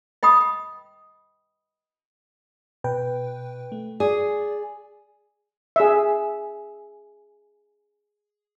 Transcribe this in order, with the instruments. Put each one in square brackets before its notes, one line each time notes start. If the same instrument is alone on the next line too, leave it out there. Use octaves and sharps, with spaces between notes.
[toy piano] D#5 G5 B5 D#6
[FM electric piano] B2 B4 G5
A3
[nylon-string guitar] G#4 [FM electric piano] D5
[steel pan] G#4 E5